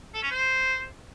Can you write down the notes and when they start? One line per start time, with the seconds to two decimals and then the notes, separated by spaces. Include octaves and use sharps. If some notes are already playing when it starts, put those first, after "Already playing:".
0.14 A4
0.22 C#4
0.31 C5